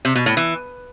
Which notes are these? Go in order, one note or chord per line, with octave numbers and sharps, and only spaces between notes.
C3
B2
A2
E3